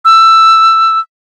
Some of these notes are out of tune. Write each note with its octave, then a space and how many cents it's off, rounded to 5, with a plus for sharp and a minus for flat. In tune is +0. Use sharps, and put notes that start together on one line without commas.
E6 +10